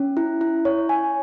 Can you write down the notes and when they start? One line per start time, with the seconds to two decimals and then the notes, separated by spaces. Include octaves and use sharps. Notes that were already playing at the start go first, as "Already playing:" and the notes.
Already playing: C#4
0.17 E4
0.41 E4
0.65 C#5
0.89 G#5